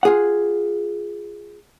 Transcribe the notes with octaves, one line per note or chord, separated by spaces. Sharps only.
F4 G#4 F#5